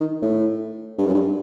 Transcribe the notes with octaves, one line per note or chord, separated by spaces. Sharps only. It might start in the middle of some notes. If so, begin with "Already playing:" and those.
D#3
A2
G2
F#2
G2